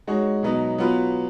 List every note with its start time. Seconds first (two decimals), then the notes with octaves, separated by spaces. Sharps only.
0.07 G#3 D#4 F#4 C#5
0.43 B2 F#3 B3 D#4
0.78 F#3 B3 F4 B4